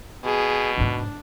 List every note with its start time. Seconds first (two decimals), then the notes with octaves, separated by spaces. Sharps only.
0.24 B2 G#4
0.78 F1 G#2 D4